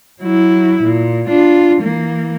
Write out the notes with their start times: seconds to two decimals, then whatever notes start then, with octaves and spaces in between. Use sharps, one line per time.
0.22 F#3 E4
0.84 A#2
1.28 D4 F4
1.82 E3 A#3